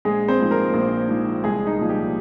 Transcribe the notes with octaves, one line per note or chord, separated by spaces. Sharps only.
A#1 G#3 G#4
C4 C5
G#2 F3
A#3 A#4
A#1
G#2 F3
C2 G#3 G#4
D#4
A#2 F3
G3 G4